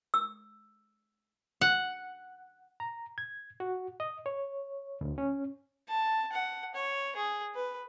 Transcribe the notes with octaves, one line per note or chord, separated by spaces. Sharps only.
E6
F#5
A#5
G#6
F#4
D#5
C#5
D2
C#4
A5
F#5
C#5
G#4
B4